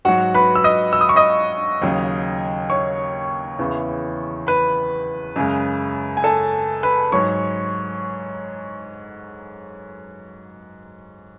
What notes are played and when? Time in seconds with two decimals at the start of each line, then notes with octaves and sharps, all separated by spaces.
0.05 G#2 F#3 F#4 F#5
0.35 B4 B5
0.55 E6
0.64 D#5 D#6
0.93 E6
1.01 D#6
1.09 C#6
1.16 D#5 D#6
1.82 D#2 C#3 F#3
2.70 C#5 C#6
3.59 E2 C#3 E3
4.47 B4 B5
5.36 F#2 C#3 G#3
6.17 G#5
6.24 A4 A5
6.83 B4 B5
7.12 G#2 F#3 C#5 C#6